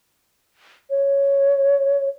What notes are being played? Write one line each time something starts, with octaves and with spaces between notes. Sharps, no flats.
C#5